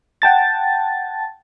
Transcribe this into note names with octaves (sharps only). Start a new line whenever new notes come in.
F#5 G5 A5 A6